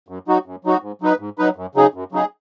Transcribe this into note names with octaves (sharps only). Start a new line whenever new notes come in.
F#2
F#3 D#4 F#4
F#2
F#3 D#4 F#4
G#2
F#3 D#4 B4
G#2
F#3 D#4 B4
F#2
C#3 F#3 D#4 G#4
F#2
C#3 F#3 D#4 G#4